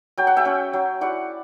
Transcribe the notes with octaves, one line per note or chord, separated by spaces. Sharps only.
F#3 G5
F#5
E5 G5
C#4
F#3
E4 D5 F#5